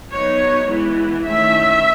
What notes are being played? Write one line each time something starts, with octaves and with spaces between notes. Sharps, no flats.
F#3 B3 D#4 C#5
E3 G#3 B3 E4
D#3 A3 C#4 E4 E5